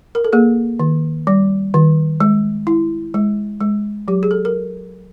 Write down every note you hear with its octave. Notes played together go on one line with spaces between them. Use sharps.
A#4
A4
A#3 G#4
D#3
G3
D#3
G#3
E4
G#3
G#3
F#3 G4
G#4
A4
A#4